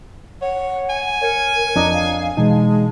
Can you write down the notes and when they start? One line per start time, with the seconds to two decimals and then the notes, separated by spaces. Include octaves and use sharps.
0.42 C#5 F#5
0.89 G#5
1.22 A#4 C#5 G#6 C#7
1.76 F2 D4 D#5 A#5
1.93 F5
2.37 B2 E3 G#3 D#4 A5